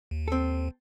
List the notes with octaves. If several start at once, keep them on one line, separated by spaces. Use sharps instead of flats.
D#2
C4 A4